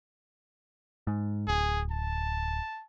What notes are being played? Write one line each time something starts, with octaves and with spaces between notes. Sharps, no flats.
G#2
D1 G#4
A5